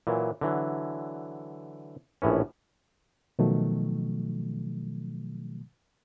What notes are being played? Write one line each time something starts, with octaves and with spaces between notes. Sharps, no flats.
A#2 E3 F#3
D3 E3 F#3
A#1 A2 E3 C#4
B2 D#3 F3 F#3 A3